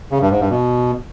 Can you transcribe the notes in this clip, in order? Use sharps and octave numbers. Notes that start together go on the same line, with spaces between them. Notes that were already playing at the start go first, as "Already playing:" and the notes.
C#3
G2
G#2
G2
B2